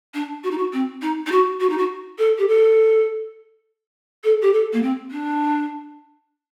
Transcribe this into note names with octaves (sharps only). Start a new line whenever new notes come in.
D4
F#4
D#4
F#4
C4
D#4
D#4
F#4
F#4
D#4
F#4
A4
G4
A4
A4
G4
A4
A#3
C4
D4